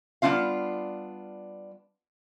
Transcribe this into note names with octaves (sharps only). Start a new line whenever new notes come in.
G3 B3 D4 D#4 F4 F5